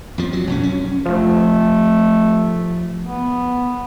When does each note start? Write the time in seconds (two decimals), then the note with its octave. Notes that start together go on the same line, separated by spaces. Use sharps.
0.18 F2 F3
0.33 F#3
0.47 B1 F#2 C#4
0.63 C#4
1.06 F1 F3 A3
3.06 B3